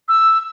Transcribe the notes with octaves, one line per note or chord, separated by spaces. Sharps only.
E6